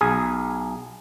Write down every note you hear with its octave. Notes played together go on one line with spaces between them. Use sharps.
B1 G#4